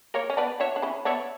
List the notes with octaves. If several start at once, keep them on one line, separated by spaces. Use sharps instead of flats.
A#3 A#4 C#5
C#4
B3 D4 B4 D5
D4 F#4 C#5 E5
D4
C#4 E4
B3 D4 C#5 E5